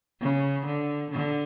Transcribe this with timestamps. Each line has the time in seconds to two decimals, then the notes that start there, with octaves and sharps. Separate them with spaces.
0.21 C#3
0.66 D3
1.11 D3